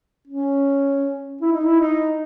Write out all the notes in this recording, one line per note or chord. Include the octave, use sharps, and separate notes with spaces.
C#4
E4
D#4
E4
D#4